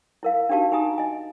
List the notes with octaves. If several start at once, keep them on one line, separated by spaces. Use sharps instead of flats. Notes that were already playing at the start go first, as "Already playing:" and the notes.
E4 A#4 F5
D4 D#4 F#4 G4 F5 A5
D#4 G4 G#5 A#5 D#6
D#5 G#5